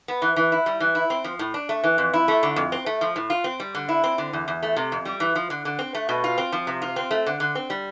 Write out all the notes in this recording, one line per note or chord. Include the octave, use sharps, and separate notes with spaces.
B3
E3
E3
E4
G3
E3
E4
C4
F3
A2
D4
A3
E3
F2
E4
A3
D3
F2
C4
A3
F3
A2
F4
C4
G3
D3
E4
C4
D3
E2
E2
A3
C3
F2
G3
E3
F3
D3
D3
C4
A3
B2
F4
C4
F3
C3
F4
C4
A3
D3
D3
C4
G3